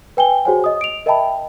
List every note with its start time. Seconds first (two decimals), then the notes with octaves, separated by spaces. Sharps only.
0.17 B4 G5 G#5 G7
0.45 F#4 G#4 C5 C#5 F#5 G#5
0.64 D#5 D#6
0.81 D7 F7
1.06 A#4 D#5 E5 G5 A5 B5